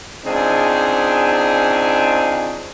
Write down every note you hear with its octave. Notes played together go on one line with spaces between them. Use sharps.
C#2 C4 D4 D#4 G#4